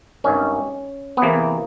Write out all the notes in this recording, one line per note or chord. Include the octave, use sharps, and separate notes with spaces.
G#1 G2 D#3 C#4
B3
E2 C3 E3 A#3